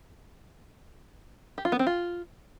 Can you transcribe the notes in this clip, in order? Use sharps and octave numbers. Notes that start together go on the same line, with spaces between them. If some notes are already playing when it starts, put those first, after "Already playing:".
G4
F4
B3
C4
F4